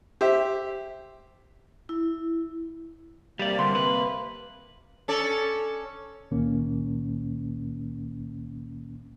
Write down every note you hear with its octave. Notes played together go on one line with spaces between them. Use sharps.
G4 C5 E5
E4
C3 G3 A#3 D5
D3 G3 C6
B4
C#4 A4 D5
C#2 A#2 D#3 A#3 C#4